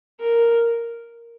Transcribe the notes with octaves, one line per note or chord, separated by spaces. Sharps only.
A#4